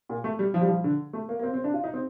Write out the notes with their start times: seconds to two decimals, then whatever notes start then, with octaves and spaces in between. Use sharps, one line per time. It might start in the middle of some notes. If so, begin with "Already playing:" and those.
0.09 A#2
0.24 A3
0.39 G3
0.54 F3
0.61 G3
0.68 F3
0.84 D3
1.13 A3
1.29 A#3
1.39 A#3
1.43 C4
1.54 C4
1.64 D4
1.74 F4
1.84 D#4
1.93 C4